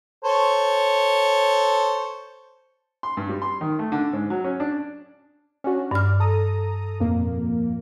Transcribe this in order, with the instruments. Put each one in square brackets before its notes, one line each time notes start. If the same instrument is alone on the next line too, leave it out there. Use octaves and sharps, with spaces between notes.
[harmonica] A4 C5 C#5
[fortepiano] C6
G2
G3
C6
D#3
A3
D3
G#2
F#3
C#4
D4
[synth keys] C#4 D4 F#4
[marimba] G2 F6 [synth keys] D5
[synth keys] A4 A#5 D#6
F2 A#2 A#3